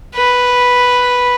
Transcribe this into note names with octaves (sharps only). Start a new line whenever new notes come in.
B4